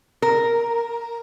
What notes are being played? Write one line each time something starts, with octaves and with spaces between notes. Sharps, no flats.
A#4